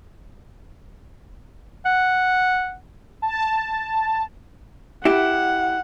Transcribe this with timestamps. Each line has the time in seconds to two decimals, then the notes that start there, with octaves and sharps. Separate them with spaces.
1.85 F#5
3.22 A5
5.05 E4 G4 F#5